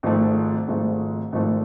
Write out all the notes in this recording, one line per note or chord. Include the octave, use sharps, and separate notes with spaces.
G#1 G#2 F3 A3
G#1 G#2 F3 A3
G#1 G#2 F3 A3